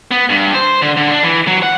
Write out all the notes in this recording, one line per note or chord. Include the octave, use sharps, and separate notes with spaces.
B3
G2
C5
D3
D3
D4
E3
F#3
F#5